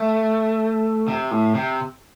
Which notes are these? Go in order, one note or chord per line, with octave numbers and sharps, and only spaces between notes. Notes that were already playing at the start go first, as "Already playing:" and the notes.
Already playing: A3
C3
A2
C3